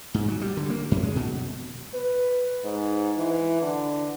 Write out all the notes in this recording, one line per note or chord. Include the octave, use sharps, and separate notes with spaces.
G#2
F#3
G3
D3
A#3
F#2
G#3
B2
B4
G#2
E3
D3